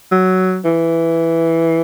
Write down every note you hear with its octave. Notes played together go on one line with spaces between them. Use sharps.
F#3
E3